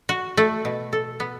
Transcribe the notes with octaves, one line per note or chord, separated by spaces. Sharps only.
F#4
A3
B2
A4
B3